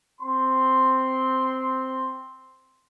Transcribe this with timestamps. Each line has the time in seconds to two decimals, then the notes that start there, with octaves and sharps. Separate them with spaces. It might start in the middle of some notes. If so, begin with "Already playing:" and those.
0.21 C4 C6